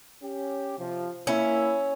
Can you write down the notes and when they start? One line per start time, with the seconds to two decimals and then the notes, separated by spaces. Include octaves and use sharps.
0.23 C#4 G4
0.79 C3 F3
1.27 A#3 C#4 E4